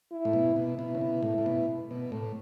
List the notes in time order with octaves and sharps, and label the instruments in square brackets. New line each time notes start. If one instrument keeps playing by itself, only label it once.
[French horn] E4
[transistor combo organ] A2
B2
B2
[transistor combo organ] B2 [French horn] E4
[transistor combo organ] C#3
B2
A2
A2
B2
B2
A2